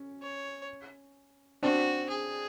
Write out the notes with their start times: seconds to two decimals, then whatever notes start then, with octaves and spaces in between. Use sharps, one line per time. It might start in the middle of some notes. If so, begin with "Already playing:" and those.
Already playing: C#4
0.22 C#5
1.63 C4 D4 F#4
2.10 G#4